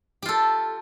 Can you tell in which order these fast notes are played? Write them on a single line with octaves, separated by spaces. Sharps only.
G4 F4 A4